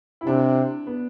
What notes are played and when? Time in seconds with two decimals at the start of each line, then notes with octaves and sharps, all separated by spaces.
0.21 E4
0.26 C3 D4
0.87 B3